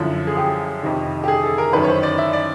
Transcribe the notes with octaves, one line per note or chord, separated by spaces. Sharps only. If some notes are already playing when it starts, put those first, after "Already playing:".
Already playing: F#2 D3 F3 E4
G#4
G4
F2 C3 D#3
G4
G#4
A4
A#4
F#2 D#3 B4
C#5
C5
D5
E5
D5